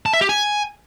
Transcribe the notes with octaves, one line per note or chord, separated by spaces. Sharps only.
A5
E5
G4
G#5